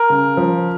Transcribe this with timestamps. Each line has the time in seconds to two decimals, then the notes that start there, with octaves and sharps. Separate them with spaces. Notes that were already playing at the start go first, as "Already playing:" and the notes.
Already playing: A#4
0.10 C#3
0.37 F3